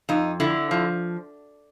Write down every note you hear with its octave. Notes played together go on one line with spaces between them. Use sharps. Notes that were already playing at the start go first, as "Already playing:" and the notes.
F2 D#4
D3 E4
F3